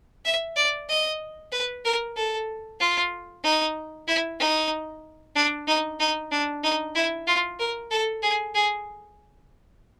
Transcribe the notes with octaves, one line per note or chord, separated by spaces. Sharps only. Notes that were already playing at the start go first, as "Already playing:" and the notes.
E5
D5
D#5
B4
A#4
A4
F4
D#4
E4
D#4
D4
D#4
D#4
D4
D#4
E4
F4
A#4
A4
G#4
G#4